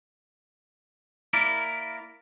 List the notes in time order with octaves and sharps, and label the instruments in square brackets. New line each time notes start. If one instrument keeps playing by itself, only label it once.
[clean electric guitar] A#3 E4 A#4 D5